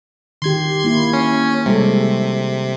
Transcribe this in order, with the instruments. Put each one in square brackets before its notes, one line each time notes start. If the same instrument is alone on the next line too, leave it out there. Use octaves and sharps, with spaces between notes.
[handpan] D#3 G4 [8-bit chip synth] C6 G#6
[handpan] A#3 E4
[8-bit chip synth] C#4
[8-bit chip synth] C3 [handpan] G3 G#3 A4